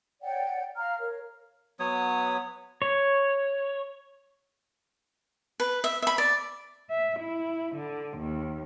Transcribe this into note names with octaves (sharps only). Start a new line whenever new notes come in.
C#5 D5 F#5 G5
F5 A#5 F6
A#4 C#5
F#3 B3 C#5 D#6
C#5
B4
E5
E5 B5
D5
E5
E4
D3
D#2